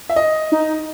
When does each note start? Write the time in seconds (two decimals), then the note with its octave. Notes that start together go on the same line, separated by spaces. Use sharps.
0.10 E5
0.16 D#5
0.52 D#4